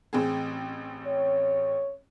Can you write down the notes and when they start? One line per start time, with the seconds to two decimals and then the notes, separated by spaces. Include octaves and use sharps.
0.13 A1 C4 G#4
1.06 C#5